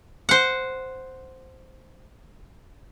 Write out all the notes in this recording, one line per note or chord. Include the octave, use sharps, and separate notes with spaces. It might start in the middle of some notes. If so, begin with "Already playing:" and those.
C5 F#5